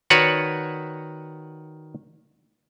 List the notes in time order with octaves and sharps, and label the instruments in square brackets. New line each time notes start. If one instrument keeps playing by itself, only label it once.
[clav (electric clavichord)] D#3 F#4 B4 C#5 D5 F#5